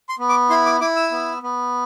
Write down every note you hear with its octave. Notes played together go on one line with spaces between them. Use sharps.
C6
B3
D6
E4 C6
D6
E4 D6
E6
B3
B3